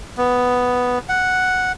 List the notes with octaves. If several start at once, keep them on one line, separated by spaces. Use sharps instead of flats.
B3
F#5